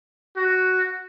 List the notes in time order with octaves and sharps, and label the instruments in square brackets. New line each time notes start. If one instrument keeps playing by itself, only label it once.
[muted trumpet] F#4